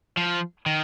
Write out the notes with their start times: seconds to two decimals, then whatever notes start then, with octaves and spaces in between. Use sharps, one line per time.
0.17 F3
0.66 D#3